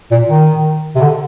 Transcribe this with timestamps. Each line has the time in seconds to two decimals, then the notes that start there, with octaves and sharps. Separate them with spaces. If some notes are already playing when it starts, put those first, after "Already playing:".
0.11 A#2
0.29 D#3
0.95 C3
1.01 D3